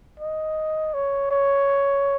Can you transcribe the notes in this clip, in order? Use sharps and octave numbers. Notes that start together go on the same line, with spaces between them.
D#5
C#5
C#5